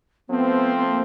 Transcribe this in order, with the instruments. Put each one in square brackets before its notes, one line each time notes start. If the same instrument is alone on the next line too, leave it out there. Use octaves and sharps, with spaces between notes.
[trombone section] F3 A3 C4 [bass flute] B3
[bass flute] B3
A#3